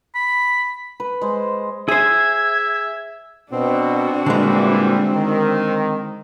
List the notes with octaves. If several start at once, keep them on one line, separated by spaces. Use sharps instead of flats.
B5
B4
G#3 C5
G#4 C5 E5 G#6
B2 C4 D4 F#4
A#2 D3 E3 G3 G#3
D#3